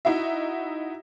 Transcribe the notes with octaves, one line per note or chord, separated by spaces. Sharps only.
D#4 E4 F#4 E5